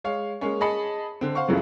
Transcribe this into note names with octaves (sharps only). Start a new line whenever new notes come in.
G#3 C#5 F5
G#3 A#3 C#4 C#5
G#4 D#5 A5 B5 C#7
D3 C4
C5 F5 F#5 C#6
C#2 F#2 C#3 E3 F#3 A3